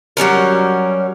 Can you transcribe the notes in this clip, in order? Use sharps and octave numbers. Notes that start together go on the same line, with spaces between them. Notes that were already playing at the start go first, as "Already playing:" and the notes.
F#3 G3 C#4 A#4